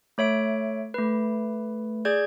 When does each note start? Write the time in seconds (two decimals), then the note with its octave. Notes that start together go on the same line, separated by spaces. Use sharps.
0.18 A3 C#5 E5 D7
0.94 A3 B4
2.05 G#4 D5 G6 G#6